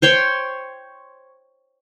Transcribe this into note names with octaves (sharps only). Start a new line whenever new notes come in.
C5 C#5 G5 C6